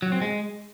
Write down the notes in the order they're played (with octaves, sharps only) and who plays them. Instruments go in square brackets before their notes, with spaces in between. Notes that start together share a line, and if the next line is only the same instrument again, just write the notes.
[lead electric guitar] F#3
C4
G#3